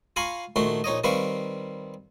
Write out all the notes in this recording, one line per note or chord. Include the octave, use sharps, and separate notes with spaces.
F4 F5 G#5 A#5 B5 C#6
A#1 D#3 A3 F#4 C6
A#1 D#4 C#5 D#5
D#3 G3 C4 B4 F5 C#6